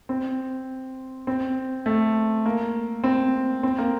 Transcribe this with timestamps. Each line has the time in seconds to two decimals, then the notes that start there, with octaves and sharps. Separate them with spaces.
0.09 C4
1.27 C4
1.86 A3
2.46 A#3
3.04 C4
3.63 C4
3.78 A#3